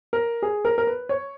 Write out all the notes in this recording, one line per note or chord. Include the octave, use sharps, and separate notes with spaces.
A#4
G#4
A#4
A#4
B4
C#5